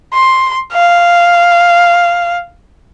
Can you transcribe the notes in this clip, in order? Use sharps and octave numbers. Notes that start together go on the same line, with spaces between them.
C6
F5